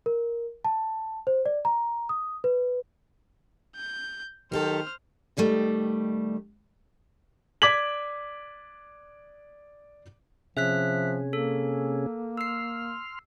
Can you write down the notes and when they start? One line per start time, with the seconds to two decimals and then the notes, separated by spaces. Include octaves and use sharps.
0.06 A#4
0.65 A5
1.27 C5
1.46 D5
1.65 A#5
2.09 D#6
2.44 B4
3.76 G6
4.52 D#3 F#3 G4 A4 C5 F6
5.37 B2 D#3 G3 A3
7.62 D5 D6 G#6 B6 F#7
10.57 C3 F3 C#4 G#4 E5 F#6 B6
11.33 A#3 A4
12.37 C6 E6 F6 C7